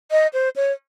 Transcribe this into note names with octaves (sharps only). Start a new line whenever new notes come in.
D#5
C5
C#5